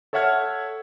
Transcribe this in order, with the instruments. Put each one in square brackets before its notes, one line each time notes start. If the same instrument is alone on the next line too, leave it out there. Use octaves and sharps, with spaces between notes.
[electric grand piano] A4 C#5 E5 F#5 F6 G#6